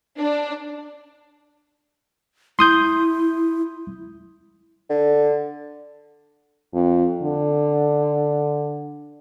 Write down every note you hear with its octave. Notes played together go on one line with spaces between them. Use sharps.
D4
E4 C6 D#6 G6
D3
F2
D3